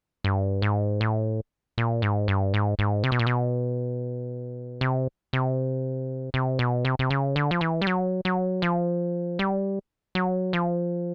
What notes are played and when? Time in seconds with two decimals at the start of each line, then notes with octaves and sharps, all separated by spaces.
0.24 G2
0.62 G#2
1.01 A2
1.78 A#2
2.02 G#2
2.28 G2
2.54 G#2
2.79 G#2
3.04 C3
3.12 B2
3.19 A#2
3.27 B2
4.81 C3
5.33 C3
6.34 C3
6.59 B2
6.85 C3
6.99 C3
7.10 C#3
7.36 D3
7.51 F3
7.61 E3
7.82 G3
7.87 F#3
8.25 F#3
8.62 F3
9.39 G3
10.15 F#3
10.53 F3